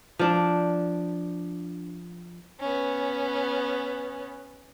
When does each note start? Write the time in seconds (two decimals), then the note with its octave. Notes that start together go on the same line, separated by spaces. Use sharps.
0.19 F3 D4
2.60 B3 C#4